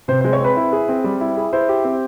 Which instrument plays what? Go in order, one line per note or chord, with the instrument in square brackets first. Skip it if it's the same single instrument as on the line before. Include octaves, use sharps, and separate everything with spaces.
[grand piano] C3 [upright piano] C5
[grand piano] G#3 [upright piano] C5
[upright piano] C#5
[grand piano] C4 [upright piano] B4
[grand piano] E4
G#4
C4
G3
E4
G#4
[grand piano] E4 [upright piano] C5
[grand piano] G4
C4